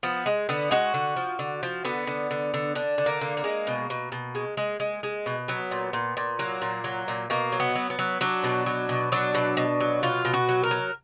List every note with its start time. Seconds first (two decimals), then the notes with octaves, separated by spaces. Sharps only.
0.03 F3 B3
0.26 G#3
0.49 D3 B3
0.71 G#3 F#4
0.94 D3
1.16 F3
1.39 D3
1.63 F3
1.85 D3 B3
2.07 D3
2.31 D3
2.54 D3
2.75 D3 D4
2.98 D3
3.06 A#3
3.21 D3
3.37 A#3
3.44 G#3
3.67 B2
3.90 B2
4.12 B2
4.35 G#3
4.57 G#3
4.80 G#3
5.03 G#3
5.26 B2
5.48 F#3 B3
5.71 A#2
5.93 A#2
6.17 A#2
6.39 F#3 A#3
6.62 A#2
6.84 F#3
7.08 A#2
7.30 B2 A#3
7.52 F#3
7.60 B3
7.75 F#3
7.90 B3
7.99 F#3
8.21 F#3 D4
8.44 B2
8.66 F#3
8.89 B2
9.12 F#3 D4
9.35 B2
9.57 B2
9.80 F#3
10.03 B2 F4
10.25 B2
10.33 F#4
10.49 F#3
10.64 A#4
10.71 F#3